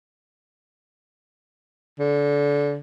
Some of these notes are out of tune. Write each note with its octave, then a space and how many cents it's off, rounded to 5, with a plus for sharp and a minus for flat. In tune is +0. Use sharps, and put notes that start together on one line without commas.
D3 -25